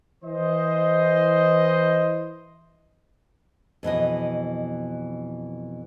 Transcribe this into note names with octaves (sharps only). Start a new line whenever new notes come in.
E3 C5 D#5
F2 B2 E3 D#5